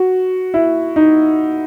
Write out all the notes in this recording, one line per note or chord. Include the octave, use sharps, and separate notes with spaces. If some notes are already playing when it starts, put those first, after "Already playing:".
Already playing: F#4
E4
D#4